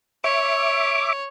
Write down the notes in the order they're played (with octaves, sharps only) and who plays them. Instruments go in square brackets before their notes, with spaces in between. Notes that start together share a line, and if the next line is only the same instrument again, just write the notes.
[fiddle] C#5 [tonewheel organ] E5 D6